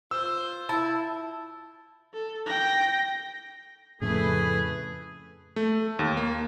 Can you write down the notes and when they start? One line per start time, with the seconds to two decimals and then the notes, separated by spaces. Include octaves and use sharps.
0.11 F4 C5 E6
0.69 E4 A5
2.13 A4
2.46 G5 A#6
4.02 F2 A2 C#3 A3 G#4 B4
5.56 A3
5.99 D#2
6.17 A#3